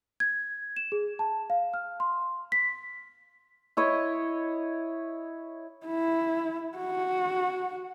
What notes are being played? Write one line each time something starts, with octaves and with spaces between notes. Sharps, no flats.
G#6
E7
G#4
A5
F5
F6
C6
B6
E4 C#5 D#5
E4
F#4